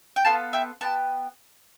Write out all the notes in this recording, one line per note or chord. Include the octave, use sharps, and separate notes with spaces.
G5
B3 F4 A4 F5 A5
E5 G5
B3 E4 G4 A5